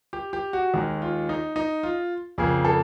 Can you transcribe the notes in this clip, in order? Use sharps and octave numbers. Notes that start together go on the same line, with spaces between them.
G4
G4
F#4
D#2 D#3 G#3
F4
D#4
D#4
F4
F2 C#3 F3 A#3 G#4
A4